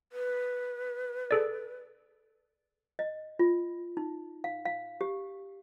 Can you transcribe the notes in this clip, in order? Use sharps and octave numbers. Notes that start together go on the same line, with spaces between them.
B4
G#4 A4 D5
D#5
F4
D#4
F5
F5
G4